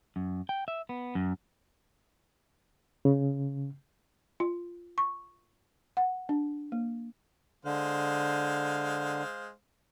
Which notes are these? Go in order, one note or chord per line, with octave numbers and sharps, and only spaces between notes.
F#2
G5
E5
B3
F#2
C#3
F4
C#6
F#5
D4
A#3
D3 G#3 C5 F5